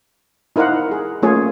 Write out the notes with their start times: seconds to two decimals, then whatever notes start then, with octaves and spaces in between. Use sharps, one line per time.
0.56 D#4 E4 A#4 C5 F5 F#5
0.91 G#4
1.22 A3 A#3 C#4 F4 G#4 C#5